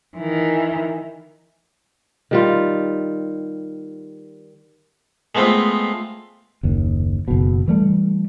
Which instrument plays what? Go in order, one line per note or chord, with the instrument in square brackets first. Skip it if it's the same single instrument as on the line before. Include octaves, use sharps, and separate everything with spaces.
[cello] D#3 E3
[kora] D#3 G3 F4
[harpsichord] G#3 A3 B3 C4 F4
[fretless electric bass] F#1 D#2
F#1 B2
E3 G3 A3